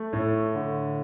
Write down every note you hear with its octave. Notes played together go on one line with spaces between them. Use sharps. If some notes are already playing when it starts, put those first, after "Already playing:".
Already playing: A3
A2
D3